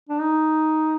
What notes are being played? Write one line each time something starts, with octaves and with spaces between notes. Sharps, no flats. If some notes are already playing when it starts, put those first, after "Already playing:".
D4
D#4